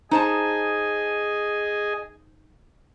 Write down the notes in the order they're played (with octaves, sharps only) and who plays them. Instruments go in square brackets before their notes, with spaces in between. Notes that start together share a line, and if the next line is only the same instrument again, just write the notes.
[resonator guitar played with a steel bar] D#4 C5 A5 [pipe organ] G#4 D#5 G#5